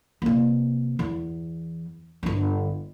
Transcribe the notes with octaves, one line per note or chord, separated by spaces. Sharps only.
C3 A#3
E2
G1 D3